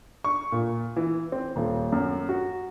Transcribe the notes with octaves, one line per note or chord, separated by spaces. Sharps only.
C#6
A#2
E3
C4
D#1
F#2
F#4